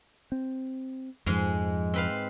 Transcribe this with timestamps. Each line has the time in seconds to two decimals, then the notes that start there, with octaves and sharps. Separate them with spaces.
0.32 C4
1.26 F2 G#2 F3 G#3
1.94 C4 B4 F5